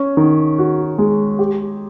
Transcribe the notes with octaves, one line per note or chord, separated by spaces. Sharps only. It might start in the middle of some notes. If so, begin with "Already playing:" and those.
Already playing: C#4
D#3
F#4
G#3
G4